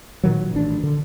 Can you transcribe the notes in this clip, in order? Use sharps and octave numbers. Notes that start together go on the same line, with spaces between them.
A#2 D#3 F#3
A1 D4
D3